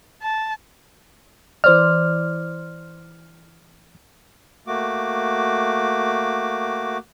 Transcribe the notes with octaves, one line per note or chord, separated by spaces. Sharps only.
A5
E3 C5 D5 F6
A3 A#3 F#4 D6